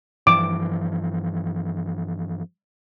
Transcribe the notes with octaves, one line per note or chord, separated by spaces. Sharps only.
G2 E3 F3 D6